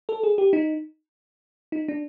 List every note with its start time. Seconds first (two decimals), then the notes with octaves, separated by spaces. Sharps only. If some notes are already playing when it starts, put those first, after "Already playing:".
0.09 A4
0.23 G#4
0.38 G4
0.53 D#4
1.72 D#4
1.88 D4